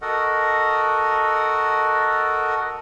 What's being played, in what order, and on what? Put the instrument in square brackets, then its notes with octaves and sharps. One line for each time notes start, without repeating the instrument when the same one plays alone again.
[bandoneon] F#4 A4 A#4 D#5 F#5